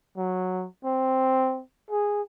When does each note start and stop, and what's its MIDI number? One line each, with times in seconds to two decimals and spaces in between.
0.17 0.66 54
0.85 1.61 60
1.90 2.22 68